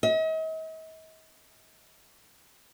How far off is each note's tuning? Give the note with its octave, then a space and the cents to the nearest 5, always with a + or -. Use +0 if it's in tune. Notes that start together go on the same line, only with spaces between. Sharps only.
D#5 +45